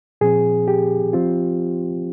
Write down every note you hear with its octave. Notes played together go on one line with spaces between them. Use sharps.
A#2 F3 C4 G#4
G4
F3 C4 F4